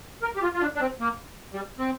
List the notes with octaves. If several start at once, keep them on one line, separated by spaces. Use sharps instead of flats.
A#4
G4
F4
F4
D4
D4
C4
A#3
G3
C4